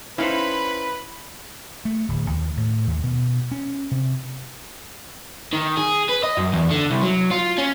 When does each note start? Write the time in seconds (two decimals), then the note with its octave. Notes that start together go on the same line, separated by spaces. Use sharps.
0.18 C#4 D#4 E4 B4 C5 F5 B5
1.85 A3
2.09 D1
2.30 D#2
2.57 A2
2.87 D#2
3.04 B2
3.52 C#4
3.91 C3
5.53 D#3
5.77 G#4
6.09 B4
6.23 D#5
6.37 F#2
6.53 E2
6.71 D3
6.90 C2
7.03 F#3
7.31 F4
7.58 C#4